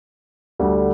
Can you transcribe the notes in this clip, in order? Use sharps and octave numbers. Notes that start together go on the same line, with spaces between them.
D2 D3 G3